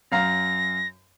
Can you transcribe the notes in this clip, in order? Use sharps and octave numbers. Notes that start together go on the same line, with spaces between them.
F#2 F5 A#5 A#6